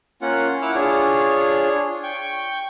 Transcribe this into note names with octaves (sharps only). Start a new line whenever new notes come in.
A#3 C#4 F4 F#5
E4 F#5 D6 E6 F6
D4 F4 G#4 C#5
G5 C#6